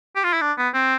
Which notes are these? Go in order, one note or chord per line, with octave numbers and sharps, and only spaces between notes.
G4
F4
E4
D4
B3
C4